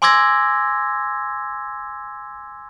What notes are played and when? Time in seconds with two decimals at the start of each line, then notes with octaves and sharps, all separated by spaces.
0.02 G#5 C6 D6 E6 G#6 A#6